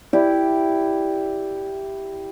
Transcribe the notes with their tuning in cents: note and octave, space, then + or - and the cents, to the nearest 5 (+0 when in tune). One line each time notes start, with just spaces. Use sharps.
E4 +0 G4 +0 D5 +0